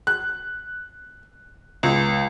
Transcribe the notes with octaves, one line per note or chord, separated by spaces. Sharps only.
F#6
C#2